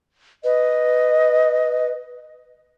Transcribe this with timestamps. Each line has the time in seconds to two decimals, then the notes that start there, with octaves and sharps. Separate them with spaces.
0.44 B4 D#5